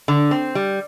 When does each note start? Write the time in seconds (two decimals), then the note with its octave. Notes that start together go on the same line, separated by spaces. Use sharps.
0.08 D3
0.31 C4
0.55 G3